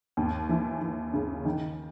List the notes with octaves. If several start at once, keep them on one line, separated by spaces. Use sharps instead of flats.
D#2
E3
E3
C#3
D#3